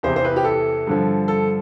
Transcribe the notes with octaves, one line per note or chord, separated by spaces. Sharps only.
E2 C3 E3 C5
C5
B4
G4
A4
G2 D3 F3
A4